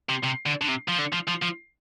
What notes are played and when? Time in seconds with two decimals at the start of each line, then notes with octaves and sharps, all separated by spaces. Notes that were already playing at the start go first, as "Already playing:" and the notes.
0.09 C3
0.24 C3
0.46 D3
0.62 D3
0.68 C3
0.89 F3
0.99 D3
1.13 F3
1.28 F3
1.43 F3